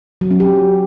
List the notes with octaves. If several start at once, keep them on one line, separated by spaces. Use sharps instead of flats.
F#3
C#4
G4